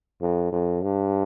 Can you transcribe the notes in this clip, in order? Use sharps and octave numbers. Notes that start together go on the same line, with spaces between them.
F2
F2
G2